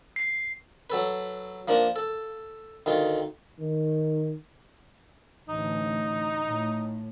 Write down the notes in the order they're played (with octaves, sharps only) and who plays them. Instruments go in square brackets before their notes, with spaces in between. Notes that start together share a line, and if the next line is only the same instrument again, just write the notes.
[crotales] C7
[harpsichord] F#3 A4 B4
F3 A#3 D4 A#4
A4
D2 D#3 F4
[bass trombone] D#3
[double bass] A1 D2 [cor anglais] D#4
[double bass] A2